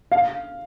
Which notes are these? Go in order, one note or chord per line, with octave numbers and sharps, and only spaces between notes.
F5